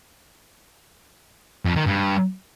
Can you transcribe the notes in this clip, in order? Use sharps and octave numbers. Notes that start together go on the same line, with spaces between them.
F2
D#3
G2